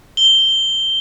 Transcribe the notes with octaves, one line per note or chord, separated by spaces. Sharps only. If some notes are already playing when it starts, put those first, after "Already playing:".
G7